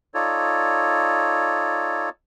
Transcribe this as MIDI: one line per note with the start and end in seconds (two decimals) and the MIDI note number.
0.14 2.09 63
0.14 2.09 65
0.14 2.09 69
0.14 2.09 73
0.14 2.09 74